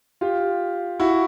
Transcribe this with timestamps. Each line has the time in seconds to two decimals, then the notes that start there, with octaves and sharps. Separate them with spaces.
0.21 F4 G4
1.00 E4 F#4